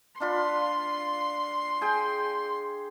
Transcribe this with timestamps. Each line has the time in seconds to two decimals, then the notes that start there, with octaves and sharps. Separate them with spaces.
0.20 D4 F4 B5 C6
1.81 G#4 G5